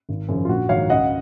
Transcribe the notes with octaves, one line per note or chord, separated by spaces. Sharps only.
G#1
F#2 C#3 F3
F4
A#1 F#4
G#2 D#3 F#3 C#5 F5
C#2 D#5 F#5